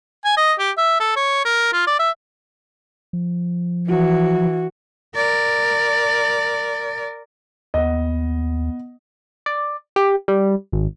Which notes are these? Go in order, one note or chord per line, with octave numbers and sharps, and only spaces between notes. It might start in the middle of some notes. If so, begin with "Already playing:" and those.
G#5
D#5
G4
E5
A4
C#5
A#4
F4
D5
E5
F3
E3 F#4
A#4 D5
D#2 B3 D#5 F#5
D5
G4
G3
G#1